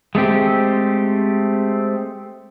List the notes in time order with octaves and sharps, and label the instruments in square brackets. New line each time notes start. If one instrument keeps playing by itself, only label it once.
[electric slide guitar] G#3 A3 C4 G4